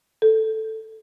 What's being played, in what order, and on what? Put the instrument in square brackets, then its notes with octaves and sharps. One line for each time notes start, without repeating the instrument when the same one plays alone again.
[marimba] A4